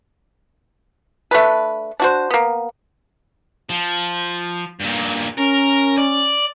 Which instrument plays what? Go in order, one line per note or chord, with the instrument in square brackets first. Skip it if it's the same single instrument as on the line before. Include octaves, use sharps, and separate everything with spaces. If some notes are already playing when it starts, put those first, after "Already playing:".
[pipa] A3 D4 B4
D4 F#4 C5
A#3 B3
[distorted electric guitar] F3
G2 A#2
[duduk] C#4 [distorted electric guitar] A#4
[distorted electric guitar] D5